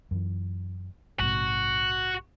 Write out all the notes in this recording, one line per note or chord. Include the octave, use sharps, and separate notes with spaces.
F#2 E3
A#1 G#2 C3 F#4